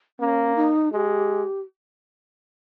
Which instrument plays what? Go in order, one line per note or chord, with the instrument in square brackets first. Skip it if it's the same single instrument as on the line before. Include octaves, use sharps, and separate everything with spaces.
[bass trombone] A#3 [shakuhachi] C#4
[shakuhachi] D#4
[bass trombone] G#3 [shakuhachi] G4